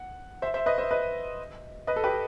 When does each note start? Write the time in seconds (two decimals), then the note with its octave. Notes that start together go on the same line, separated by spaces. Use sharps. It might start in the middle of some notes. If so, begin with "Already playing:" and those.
Already playing: F#5
0.42 C5 E5
0.54 C5 E5
0.66 B4 D#5
0.78 C5 E5
0.91 B4 D#5
1.87 B4 D#5
1.96 A4
2.04 G4 B4